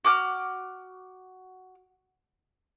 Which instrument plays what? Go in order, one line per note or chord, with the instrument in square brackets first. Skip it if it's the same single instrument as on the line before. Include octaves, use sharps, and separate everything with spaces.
[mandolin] F#4 D6 F6